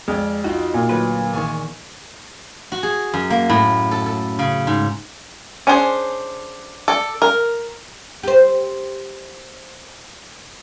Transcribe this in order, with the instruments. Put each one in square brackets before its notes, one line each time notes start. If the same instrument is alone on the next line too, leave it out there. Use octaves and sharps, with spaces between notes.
[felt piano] F2 [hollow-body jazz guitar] G#3 [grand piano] D5 G5 F6
[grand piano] D#4 F4 G5 [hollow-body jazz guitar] F#4
[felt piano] A#2
[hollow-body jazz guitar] D2 F#3 B4
[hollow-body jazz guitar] E2 D#3 [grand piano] G#5 C#6
[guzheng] F#4
G#4
F#2
A#3
A2
A4
A4
C#3
G#2
[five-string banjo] C#4 D4 G#4 C5
A4 D5
A#4
[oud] G4 C5